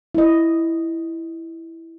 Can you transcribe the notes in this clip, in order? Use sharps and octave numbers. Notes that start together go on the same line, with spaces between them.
E4 D#5